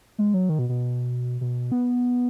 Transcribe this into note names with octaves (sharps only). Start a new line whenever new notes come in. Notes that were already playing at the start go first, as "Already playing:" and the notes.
G#3
F#3
D#3
B2
B2
B2
B3